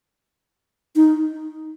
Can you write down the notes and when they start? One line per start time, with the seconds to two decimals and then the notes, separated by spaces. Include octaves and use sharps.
0.96 D#4